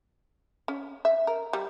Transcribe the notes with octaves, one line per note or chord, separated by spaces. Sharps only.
C#4
E5
A#4
G3